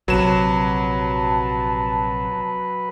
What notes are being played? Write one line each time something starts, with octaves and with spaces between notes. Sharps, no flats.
A#1 C3 F#3 B4 A5 E7